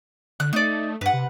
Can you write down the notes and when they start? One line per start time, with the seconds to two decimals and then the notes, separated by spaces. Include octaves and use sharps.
0.40 D3 F#6
0.53 A3 D#4 D5
1.01 G2 B4 F#5
1.13 C3